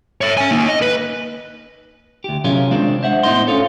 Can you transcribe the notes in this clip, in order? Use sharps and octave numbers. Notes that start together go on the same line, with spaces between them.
C#5 E5
C#4 G#5
A#3 D#4
D#5
B4
D2 G4
C3 F#3 C#4 F4 G#4 A#4
D#3 G#3 C4 D4
C5 E5 F#5
A2 B3 D#4 C5 D#5 C6
C#4 D#4 F4 A4 C#5